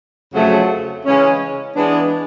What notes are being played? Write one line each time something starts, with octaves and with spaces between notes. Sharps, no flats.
F2 C#3 F#3 A3
C#3 E3 G#3 C#4
E3 G#3 B3 D4